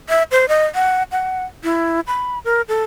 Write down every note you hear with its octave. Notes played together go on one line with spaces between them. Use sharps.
E5
C5
D#5
F#5
F#5
E4
B5
A#4
A4